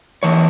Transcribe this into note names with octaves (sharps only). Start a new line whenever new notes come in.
E2 E3 C#5